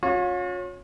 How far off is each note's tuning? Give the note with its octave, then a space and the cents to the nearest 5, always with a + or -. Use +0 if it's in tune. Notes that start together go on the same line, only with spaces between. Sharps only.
C#4 +0 F4 +45